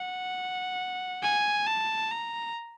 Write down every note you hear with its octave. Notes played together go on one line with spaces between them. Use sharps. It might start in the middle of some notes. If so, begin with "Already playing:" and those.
Already playing: F#5
G#5
A5
A#5